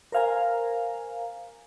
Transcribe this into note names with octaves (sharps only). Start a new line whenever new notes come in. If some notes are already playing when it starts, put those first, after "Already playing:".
A#4 C5 F5 G#5 A#5